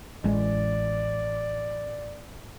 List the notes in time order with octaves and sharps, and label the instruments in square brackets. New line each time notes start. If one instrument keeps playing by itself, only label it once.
[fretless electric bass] A1 G#3 [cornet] D5